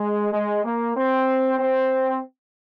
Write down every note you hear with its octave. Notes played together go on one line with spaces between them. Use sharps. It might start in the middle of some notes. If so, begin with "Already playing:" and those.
Already playing: G#3
G#3
A#3
C4
C4